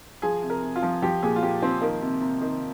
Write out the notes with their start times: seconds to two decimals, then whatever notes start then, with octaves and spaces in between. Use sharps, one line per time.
0.22 F3 G#4
0.42 C3
0.50 A#4
0.63 C3
0.76 F4
0.82 F3
1.02 F3 G4
1.23 A#2 G#4
1.36 F4
1.42 A#2 G4
1.62 F3 C4
1.81 D#3 A#3
2.01 C3
2.21 C3
2.41 D#3